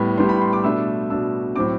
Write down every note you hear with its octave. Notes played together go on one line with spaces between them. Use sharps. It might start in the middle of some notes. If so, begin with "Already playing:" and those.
Already playing: A2 G3 B3
A2 G3 B3 C6
B5
C6
D6
B2 A3 D4 E6
B2 A3 D4 E6
A2 F#3 C4 D6